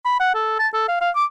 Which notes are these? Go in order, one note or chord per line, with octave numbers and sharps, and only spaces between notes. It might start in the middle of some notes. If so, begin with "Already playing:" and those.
B5
F#5
A4
A5
A4
F5
F5
D6